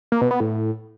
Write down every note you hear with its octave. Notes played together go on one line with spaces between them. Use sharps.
A#3
B2
B3
A2